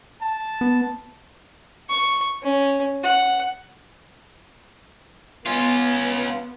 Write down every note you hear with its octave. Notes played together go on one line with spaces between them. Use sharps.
A5
B3
C#6
C#4
F#5
B3 C#4 F4